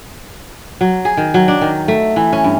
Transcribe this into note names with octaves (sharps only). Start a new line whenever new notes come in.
F#3
G#4
D#3
F#3
D4
D#3
A3
E3
C#4
G2